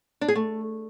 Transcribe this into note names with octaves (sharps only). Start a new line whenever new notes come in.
D4
G#4
A3